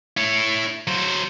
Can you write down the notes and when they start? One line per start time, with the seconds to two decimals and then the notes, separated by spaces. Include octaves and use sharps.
0.17 E4 C#5
0.87 F#3 C5